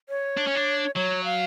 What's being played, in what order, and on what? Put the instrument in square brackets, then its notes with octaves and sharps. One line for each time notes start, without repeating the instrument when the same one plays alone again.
[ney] C#5
[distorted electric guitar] D4
C#4
D4
[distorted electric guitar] F#3 [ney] C#5
[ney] F5